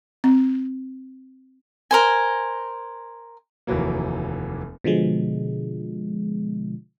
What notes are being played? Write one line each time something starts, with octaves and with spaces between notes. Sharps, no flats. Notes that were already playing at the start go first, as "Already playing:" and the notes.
C4
A#4 C5 G#5
F1 D#2 E3 F#3 A#3
B2 D3 F3 G#3